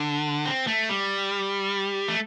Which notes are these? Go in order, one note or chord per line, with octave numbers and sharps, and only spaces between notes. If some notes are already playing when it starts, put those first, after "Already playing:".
Already playing: D3
C4
A3
G3
A3